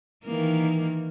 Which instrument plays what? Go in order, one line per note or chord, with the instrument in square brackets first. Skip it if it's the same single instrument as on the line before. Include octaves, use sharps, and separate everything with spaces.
[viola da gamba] D#3 E3 A#3